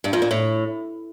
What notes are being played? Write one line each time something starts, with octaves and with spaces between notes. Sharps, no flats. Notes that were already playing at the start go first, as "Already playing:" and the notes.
G2
F2
A#2
A2